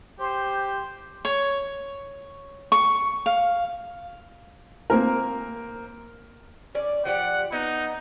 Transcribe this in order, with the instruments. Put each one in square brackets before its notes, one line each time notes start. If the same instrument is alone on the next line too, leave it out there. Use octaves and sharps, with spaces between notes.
[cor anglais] G4 [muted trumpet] C5
[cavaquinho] C#5
C#6
F5
[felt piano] A#3 C4 A#4
[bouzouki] C#4 D5
[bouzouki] F3 G4 D5 [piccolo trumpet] F#5
[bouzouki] B3 D#5 [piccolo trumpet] D#4